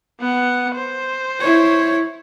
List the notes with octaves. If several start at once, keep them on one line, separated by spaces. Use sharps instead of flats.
B3 F#5
C5
E4 C#5